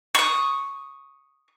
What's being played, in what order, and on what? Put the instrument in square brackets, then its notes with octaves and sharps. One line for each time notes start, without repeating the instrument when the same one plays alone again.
[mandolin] C#6 D#6